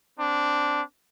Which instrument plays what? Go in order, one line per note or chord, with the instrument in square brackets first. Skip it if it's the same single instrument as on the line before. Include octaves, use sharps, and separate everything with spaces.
[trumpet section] C4 D4